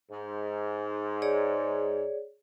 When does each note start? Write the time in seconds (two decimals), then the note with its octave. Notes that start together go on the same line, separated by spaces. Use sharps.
0.11 G#2
1.22 G#4 C#5 D5